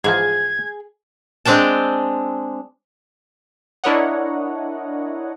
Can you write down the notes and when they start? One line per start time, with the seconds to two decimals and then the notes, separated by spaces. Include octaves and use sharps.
0.04 G#2 E3 F3 G#4 G#6
1.45 G#3 C4 D4 G5 A5
3.84 D4 E4 A#4 C#5 D#5 F#5